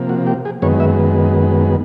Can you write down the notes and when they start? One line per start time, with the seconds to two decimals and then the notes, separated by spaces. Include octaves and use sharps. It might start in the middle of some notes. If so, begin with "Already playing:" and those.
Already playing: C3 F3 A#3
0.09 F#4
0.27 G4
0.45 G#4
0.62 F#2 D#3 G#3 B3 C#5
0.80 E5